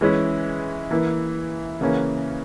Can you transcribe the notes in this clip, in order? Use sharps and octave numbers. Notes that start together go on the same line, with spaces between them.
E3 G#3 C#4 E4
E3 A#3 E4
C#3 E3 A#3 C#4